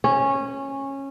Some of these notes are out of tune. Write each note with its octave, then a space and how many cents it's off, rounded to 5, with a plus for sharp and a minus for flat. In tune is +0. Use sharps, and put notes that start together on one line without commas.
C#4 -15